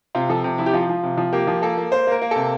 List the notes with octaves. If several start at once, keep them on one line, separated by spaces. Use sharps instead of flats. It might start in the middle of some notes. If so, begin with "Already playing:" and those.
C3 F4
F3 A4
C3
F3 E4
G4
F3 F4
F3
C3
F3
A#3 G4
F3
A#3 A4
A#3
A#3 C5
A#3 A#4
A#3
C3 A4